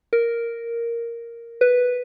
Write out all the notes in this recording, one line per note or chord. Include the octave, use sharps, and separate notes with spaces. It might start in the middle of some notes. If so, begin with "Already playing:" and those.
A#4
B4